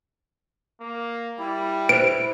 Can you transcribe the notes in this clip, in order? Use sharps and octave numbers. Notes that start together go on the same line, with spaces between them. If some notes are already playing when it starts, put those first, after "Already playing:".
A#3
G3 E4
B4 C5 D7